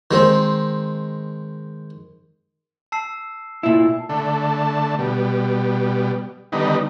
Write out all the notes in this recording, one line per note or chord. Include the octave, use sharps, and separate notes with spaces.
D#3 G#3 C4
A5 E6 C7
A#2 E4
D3 A3
B2 G3
D3 D#3 G3 B3 D#4